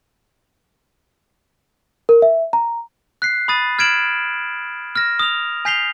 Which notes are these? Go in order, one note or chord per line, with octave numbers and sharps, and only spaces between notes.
A#4
E5
A#5
F#6 B6 C7
B5 D#6 A6 D#7
F6 G#6 B6 D7 E7 F#7
F6 A#6 E7
D#6 F7
G#5 G6 B6 C7 F7 G7